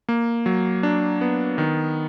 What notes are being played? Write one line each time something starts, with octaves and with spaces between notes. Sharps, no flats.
A#3
F#3
D4
B3
D#3